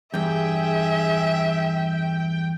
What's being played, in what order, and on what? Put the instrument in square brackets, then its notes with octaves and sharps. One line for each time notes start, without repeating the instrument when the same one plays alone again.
[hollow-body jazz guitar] E2 G2 [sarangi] G#4 [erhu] E5 [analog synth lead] G5